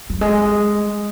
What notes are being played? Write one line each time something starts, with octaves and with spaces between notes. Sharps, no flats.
F#3
G#3